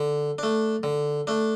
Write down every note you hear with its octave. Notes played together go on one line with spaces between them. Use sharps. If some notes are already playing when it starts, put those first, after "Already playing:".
Already playing: D3
A3 D4
D3
A3 D4